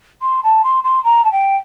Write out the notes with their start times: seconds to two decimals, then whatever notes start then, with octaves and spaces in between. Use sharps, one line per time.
0.22 C6
0.43 A5
0.64 C6
0.84 C6
1.04 A#5
1.24 A5
1.31 G5